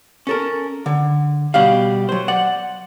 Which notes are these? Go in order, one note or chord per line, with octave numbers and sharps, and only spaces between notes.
C#4 A4 A#4
D3
B2 G3 F5
F#3 C5
D5 F#5